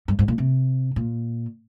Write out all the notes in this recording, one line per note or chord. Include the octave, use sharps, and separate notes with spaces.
G2
G#2
A#2
C3
A#2